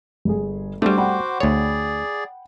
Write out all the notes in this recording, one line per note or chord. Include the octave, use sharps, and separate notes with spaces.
G1 G#4
G3 A3 D4 F#4 C5 D6
F#5 G5 B5
D2 G#4 C#5 D5